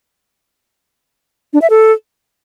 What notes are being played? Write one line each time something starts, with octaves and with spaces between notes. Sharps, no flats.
D4
E5
A4